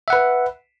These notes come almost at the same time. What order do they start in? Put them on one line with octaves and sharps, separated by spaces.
E5 F#5 B4